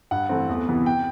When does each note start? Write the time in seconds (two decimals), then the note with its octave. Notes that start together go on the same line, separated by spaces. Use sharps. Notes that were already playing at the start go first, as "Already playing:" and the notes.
0.11 G2 F#5
0.29 E3 A3 C4
0.49 E2
0.68 C3 E3 B3
0.86 G5